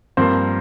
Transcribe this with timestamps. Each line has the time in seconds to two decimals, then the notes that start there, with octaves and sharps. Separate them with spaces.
0.17 G2 F3 A#3 C4 C5